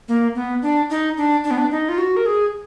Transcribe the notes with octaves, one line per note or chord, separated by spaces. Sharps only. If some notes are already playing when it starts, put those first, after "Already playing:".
A#3
B3
D4
D#4
D4
D4
B3
D4
D#4
F4
F#4
A#4
G#4